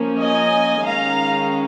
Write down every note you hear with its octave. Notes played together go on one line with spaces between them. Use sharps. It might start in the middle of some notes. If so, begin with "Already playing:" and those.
Already playing: F3 A#3 C#4
D#5 G#5
D#3 G#3 C#4 F5 A#5